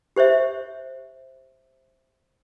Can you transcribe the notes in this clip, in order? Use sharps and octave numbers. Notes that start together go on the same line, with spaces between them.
G4 C5 C#5 E5